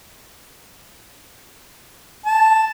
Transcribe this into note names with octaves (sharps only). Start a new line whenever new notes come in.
A5